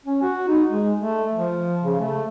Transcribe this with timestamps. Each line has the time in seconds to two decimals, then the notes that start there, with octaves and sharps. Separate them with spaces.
0.06 C#4
0.22 F#4
0.48 D#4
0.69 G#3
0.99 A3
1.34 F3
1.84 C#3
2.00 A3